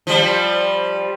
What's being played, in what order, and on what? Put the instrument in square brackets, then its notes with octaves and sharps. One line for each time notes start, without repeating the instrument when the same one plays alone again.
[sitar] F3 G3